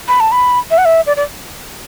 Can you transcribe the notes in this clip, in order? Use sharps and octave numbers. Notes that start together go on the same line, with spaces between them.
B5
A5
B5
E5
F#5
E5
D5
D5